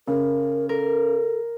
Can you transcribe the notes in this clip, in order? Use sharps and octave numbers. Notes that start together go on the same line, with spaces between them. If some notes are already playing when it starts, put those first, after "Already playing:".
C#3 A#4
A4 A#4